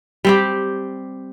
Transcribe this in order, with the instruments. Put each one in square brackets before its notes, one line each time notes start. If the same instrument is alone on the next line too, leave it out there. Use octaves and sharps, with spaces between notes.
[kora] G3 C4 G4